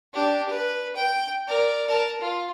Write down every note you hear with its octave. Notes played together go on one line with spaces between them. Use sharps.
D4 G4
B4
G5
A#4 D5
A#4 A5
F4